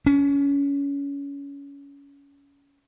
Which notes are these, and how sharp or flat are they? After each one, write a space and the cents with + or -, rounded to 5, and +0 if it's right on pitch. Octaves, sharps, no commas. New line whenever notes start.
C#4 +25